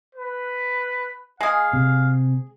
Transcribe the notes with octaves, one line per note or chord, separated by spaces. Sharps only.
B4
G#3 G#4 F5
C3